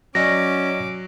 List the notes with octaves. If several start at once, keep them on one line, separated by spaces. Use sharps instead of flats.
F#3 C#4 D5 D#5 D6 A#6